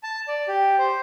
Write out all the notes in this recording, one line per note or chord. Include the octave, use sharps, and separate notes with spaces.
A5
D5
G4
C5